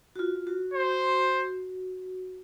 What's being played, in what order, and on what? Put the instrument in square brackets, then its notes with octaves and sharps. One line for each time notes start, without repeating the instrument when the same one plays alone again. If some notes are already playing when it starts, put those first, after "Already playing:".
[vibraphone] F#4
F4
F#4
[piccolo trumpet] C5